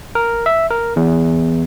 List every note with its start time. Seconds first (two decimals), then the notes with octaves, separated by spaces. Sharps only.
0.15 A#4
0.46 E5
0.70 A#4
0.96 E2